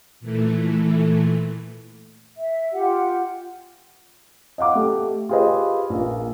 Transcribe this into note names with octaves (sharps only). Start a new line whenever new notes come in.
A#2 E3 A3
E5
F4 G4 F#5
D#5 F5 F#5 D6
A3 G4
F4 G4 G#4 B4 C5 D#5
A#1 A#3